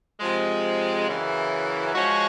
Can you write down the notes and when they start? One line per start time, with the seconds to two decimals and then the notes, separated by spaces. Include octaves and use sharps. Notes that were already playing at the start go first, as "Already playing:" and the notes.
0.20 C3 F3 G#3
1.08 F#2 C#3 E3
1.95 F3 G#3 C#4 F#4